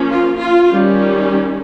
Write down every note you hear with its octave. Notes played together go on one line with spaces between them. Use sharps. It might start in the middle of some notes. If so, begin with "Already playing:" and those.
Already playing: F3 A#3 C#4
F4
F4
D#3 G3 C#4